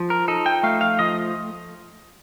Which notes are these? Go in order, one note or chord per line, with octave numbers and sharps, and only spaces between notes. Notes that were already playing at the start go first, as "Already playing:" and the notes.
Already playing: F3
A#4
D#4 A4
G5
A3 F5
F5
F3 D#5